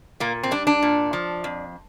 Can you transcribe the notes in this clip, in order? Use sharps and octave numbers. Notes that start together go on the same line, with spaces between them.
A#2 A#3
C4
G3 D4
D4
A#2
F3
F2